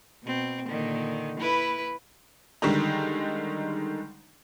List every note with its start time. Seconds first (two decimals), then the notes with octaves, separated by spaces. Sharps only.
0.23 B2 C4
0.68 A#2 D3 D#3
1.40 E4 B4
2.62 D3 D#3 G3 G#3 D#4